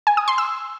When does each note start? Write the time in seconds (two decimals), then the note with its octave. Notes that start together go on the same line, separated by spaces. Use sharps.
0.07 G#5
0.17 D#6
0.28 C6
0.38 E6